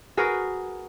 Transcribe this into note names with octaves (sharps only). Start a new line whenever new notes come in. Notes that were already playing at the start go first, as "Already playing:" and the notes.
F#4 G#4 A#4 B4